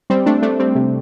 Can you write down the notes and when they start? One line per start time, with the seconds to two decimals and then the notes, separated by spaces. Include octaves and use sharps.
0.10 G3 C4
0.26 A3 D4
0.42 A3 D4
0.59 G3 C4
0.75 C3